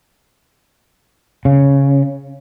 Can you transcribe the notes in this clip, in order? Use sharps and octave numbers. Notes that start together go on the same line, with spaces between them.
C#3